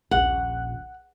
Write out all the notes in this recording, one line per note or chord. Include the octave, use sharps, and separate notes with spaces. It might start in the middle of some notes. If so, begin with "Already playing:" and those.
D#1 A#1 F#5